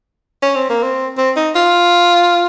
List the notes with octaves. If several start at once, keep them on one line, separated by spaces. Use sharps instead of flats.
C#4
C4
A#3
C4
C4
D#4
F4